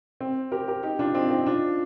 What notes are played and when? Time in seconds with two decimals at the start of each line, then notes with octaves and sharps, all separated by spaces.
0.21 C4
0.52 G4 A#4
0.68 G4 A#4
0.83 D#4 G4
0.99 D4 F4
1.15 C4 D#4
1.31 C4 D#4
1.46 D4 F4